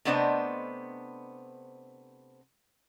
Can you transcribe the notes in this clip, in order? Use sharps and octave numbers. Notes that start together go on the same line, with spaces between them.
C3 A3 B3 D4 C5 D#5